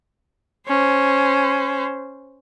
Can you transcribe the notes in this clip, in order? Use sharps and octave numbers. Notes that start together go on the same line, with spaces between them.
C#4 C5